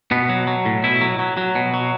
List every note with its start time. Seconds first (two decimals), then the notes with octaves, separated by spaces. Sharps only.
0.11 B2 B3
0.29 F#3
0.47 F#3
0.65 A2
0.84 B2 E4
1.01 F#3
1.19 F#3
1.37 F#3
1.55 B2
1.74 F#3